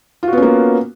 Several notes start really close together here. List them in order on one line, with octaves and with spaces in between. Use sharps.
F4 F#4 B3 C#4 A#3